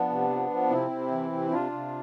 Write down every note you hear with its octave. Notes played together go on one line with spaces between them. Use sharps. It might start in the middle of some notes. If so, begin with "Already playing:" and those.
Already playing: F3 B3 D4
C3
F3
F3
C3 C4 E4
C3
E3
C3
C3 D4 F4
C3